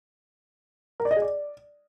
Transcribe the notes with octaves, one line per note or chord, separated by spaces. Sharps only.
A#4
D5
D#5
G#4
D5